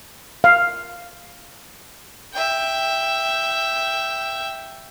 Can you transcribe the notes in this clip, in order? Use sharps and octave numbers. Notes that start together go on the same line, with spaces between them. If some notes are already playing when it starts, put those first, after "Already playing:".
F5
E5 G5